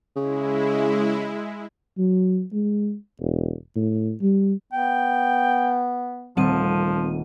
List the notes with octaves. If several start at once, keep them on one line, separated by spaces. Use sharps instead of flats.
C#3 G#3 E4
F#3
G#3
E1
A2
G3
B3 G5
D#1 F3 G3 A3 C4 D#7